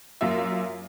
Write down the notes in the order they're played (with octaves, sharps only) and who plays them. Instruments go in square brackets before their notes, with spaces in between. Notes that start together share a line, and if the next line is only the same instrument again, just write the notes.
[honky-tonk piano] F#2 A#3 F4 E5